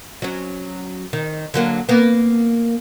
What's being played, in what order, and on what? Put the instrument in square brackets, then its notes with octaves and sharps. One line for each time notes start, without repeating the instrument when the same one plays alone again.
[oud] F#3 C#4
D#3
D3 F#3 A#3
A#3 B3